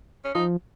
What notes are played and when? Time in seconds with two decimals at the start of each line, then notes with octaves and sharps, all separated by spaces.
0.25 C#4
0.35 F3 D#4